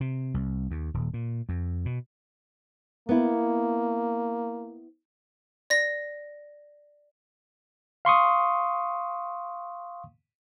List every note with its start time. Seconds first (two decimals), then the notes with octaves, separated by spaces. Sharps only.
0.01 C3
0.34 C2
0.71 D#2
0.94 D#1
1.14 A#2
1.49 F2
1.85 B2
3.09 A#3 B3 E4
5.70 D5 A#6
8.05 F5 C6 C#6 D#6